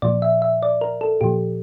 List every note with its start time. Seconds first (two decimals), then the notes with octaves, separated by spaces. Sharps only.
0.02 A#2 F3 D5
0.22 E5
0.42 E5
0.63 D5
0.81 A#4
1.01 A4
1.21 A#2 F3 G4